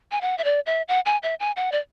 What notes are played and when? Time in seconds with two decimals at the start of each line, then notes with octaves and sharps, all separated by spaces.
0.11 G#5
0.21 F#5
0.38 E5
0.44 D5
0.66 E5
0.88 F#5
1.05 G#5
1.23 E5
1.40 G#5
1.56 F#5
1.72 D5